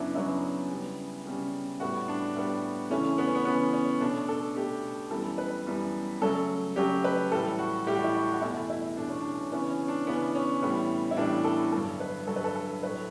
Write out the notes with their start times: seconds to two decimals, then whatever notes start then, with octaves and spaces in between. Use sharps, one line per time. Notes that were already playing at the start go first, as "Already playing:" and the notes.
Already playing: F#2 C#3 F#3 B3 D4 E4
0.15 F#2 C#3 F#3 B3 E4
0.70 C#3 G3 B3
1.25 C#3 G3 B3
1.80 A2 G3 B3 F#4
2.08 D4
2.35 A2 G3 B3
2.90 C#3 E3 A3 C#4
3.18 B3
3.26 C#4
3.35 B3
3.45 C#3 E3 A3 B3
3.73 C#4
4.00 B2 A3 D4
4.28 A4
4.56 B2 A3 G4
5.11 F#2 E3 G3 B3 A4
5.38 B4
5.66 F#2 E3 G3 B3
6.21 C#3 F#3 A3 A4
6.76 C#3 F#3 A3 G4
7.04 B4
7.32 A2 E3 G3 A4
7.58 F#4
7.87 A2 E3 G3 G4
7.95 F#4
8.04 E4
8.14 F#4
8.32 F#4
8.42 E2 B2 A3 E4
8.70 E4
8.97 E2 B2 A3 D4
9.09 C#4
9.20 D4
9.52 C#3 E3 B3 C#4
9.70 C#4
9.88 D4
10.07 C#3 E3 B3
10.35 C#4
10.62 A2 E3 G3 B3
11.11 E4
11.17 A2 E3 G3 B3 D4
11.44 A4
11.72 G2 D3 F#3 A4
12.00 B4
12.27 G2 D3 F#3 A4
12.36 B4
12.44 A4
12.56 A4
12.82 A2 F#3 A3 B4